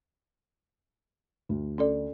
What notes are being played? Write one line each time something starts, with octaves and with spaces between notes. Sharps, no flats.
D2
C#4 A4 D5